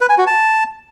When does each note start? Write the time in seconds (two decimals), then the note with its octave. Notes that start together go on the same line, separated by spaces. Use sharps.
0.01 B4
0.09 G#5
0.18 F#4
0.27 A5